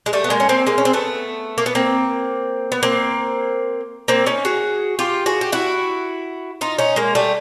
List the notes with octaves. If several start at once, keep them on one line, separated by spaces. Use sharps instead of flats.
G#3
G3 A3
B3
G#3 A#3
C#4
A#3 C4
G#3 A#3
C#4
C4
A3 B3
A#3
B3
A#3 C4
B3
A#3 C4
A#3 C4
C#4 D#4
F#4 G#4
F4 G4
F#4 G#4
G4
E4 F#4
D#4 F4
C#4 D#4
G#3 A#3
G3 A3